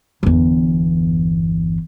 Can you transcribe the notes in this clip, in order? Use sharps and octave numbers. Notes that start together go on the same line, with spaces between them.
G1 E2